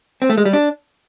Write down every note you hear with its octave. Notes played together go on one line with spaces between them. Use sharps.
C4
A3
G#3
G3
D4